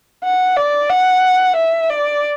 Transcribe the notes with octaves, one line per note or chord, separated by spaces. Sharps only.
F#5
D5
F#5
E5
D5